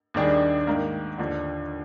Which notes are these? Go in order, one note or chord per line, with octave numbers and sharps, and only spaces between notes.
D#2 D#3 G3 D4 G#4
G#2 D#3 A#3
D#2 D3 F3